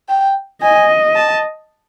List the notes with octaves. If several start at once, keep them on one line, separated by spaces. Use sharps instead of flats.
G5
D#5 G#5
A5